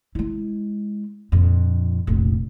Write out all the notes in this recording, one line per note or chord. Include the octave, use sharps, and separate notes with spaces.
G#3 E4
A#1 F2
F1 A#1